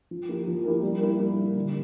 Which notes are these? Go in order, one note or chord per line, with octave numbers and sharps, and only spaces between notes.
F3
A#3 E4 G4 A#4
F3
A#3 E4 G4 A#4
G3
A#3 E4 A#4
G3
A#3 E4 A#4
D3